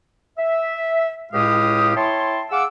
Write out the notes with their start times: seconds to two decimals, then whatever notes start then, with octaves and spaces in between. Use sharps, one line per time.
0.38 E5
1.33 C#2 A2 G#3 G4 F5 D#6
1.96 E4 C#5 G5 A5 C6
2.51 G#4 F5 F#5 D6 E6